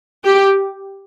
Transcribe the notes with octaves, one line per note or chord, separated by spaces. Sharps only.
G4